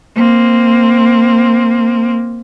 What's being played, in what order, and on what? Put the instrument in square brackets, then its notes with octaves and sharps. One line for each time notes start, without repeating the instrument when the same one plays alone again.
[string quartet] A#3 C4